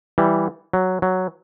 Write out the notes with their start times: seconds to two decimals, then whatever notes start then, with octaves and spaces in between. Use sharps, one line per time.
0.18 E3 G3
0.73 F#3
1.02 F#3